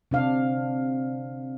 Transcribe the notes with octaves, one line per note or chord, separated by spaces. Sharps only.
C3 D4 F5